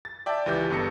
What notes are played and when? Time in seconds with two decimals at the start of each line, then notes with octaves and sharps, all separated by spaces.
0.05 A6
0.26 D5 E5 G5 A5
0.46 C#2 E3 G4 G6
0.70 G1 G2 B3 A4 A#6 C#7